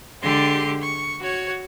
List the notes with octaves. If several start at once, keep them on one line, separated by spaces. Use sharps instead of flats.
D3 G#3 G4 C6
C#6
F#4 C#5